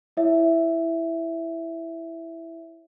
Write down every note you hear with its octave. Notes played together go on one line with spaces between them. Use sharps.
E4 C#5 E5